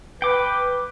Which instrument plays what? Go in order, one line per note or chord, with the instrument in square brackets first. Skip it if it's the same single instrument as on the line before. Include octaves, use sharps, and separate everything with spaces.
[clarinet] B4 [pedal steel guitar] G5 D6